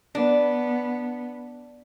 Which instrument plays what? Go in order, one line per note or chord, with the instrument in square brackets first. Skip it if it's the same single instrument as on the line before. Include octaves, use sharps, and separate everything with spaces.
[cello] B3 [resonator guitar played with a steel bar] D4